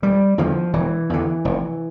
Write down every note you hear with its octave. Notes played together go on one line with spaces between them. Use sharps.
E1 G3
E2 D3 F3
E1 E3
E2 D3
F1